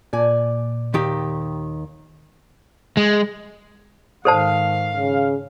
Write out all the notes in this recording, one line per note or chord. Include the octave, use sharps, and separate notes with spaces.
A#2 D5 G#5
D#2 D#3 G4
G#3
G#2 D#3 A4 C5 F5 A5
C#3